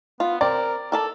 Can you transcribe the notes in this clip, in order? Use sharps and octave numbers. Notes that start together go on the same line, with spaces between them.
B3 F4
C4 A#4 D5
A4 A#4 D5 A5